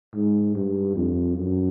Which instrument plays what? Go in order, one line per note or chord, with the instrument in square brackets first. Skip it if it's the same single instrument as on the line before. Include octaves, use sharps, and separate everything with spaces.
[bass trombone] G#2
G2
F2
F#2